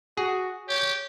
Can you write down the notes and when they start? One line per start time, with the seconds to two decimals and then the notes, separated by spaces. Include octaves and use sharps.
0.17 F#4 G#4
0.69 G4 C#5